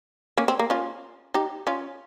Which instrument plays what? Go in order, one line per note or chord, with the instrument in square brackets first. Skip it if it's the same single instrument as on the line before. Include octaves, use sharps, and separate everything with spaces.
[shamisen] A#3 C#4
C4
A#3
C#4 F4
D#4 G4
C#4 F4